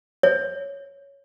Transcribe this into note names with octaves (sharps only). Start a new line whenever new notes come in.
C#5